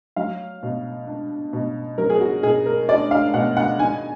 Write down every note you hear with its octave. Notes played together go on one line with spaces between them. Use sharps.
F#3 F5
B2
D4
B2
F#3 A#4
G#4
F#4
B2 G#4
A#4
D4 D5
F5
B2 F#5
F#5
D#3 G#5